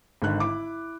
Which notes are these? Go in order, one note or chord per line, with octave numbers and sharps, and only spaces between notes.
G#1 D3 D#3 F#6
E4 D6